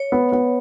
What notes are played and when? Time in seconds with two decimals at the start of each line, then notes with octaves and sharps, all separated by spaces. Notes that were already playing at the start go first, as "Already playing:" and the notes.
Already playing: C#5
0.12 B3
0.32 B3